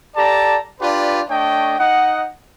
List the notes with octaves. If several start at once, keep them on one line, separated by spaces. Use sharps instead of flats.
G4 A4 D5 A5 A#5
D4 F4 G4 B4 D5
A3 D4 C#5 D#5 G5
D#4 D#5 F#5